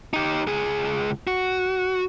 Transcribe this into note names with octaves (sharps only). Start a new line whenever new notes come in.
D#4 G4
C#2 G#4
F#4